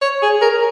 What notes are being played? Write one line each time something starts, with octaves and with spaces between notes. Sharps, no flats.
C#5
G#4
A#4